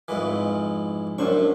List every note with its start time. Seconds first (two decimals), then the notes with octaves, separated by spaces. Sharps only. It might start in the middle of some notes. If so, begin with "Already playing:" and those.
0.08 F2 G#2 E3
1.18 F#2 A2 C#4 D4 C5 C#6